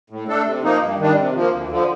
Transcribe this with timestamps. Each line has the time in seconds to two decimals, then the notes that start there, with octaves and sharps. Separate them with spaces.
0.10 A2
0.28 A3 D4 A4
0.46 C3
0.63 F3 A#3 D#4
0.81 G2
0.98 D#3 G3 D4
1.17 C3
1.34 F3
1.39 A#3
1.52 D2
1.70 D3 F3